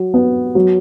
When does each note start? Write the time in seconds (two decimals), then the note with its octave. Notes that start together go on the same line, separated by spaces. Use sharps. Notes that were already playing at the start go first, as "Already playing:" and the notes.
Already playing: F#3
0.14 B3
0.55 F#3